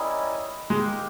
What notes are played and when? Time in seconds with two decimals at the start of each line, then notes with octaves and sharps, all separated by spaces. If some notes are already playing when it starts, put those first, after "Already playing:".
Already playing: G3 C#4 E4 A#4 D#5
0.70 G#3 A#3 D#4 G4